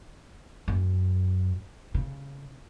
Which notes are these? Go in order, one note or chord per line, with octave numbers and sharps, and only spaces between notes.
F#2
C#3